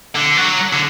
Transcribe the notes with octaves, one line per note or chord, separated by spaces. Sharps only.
D3
F#3
D3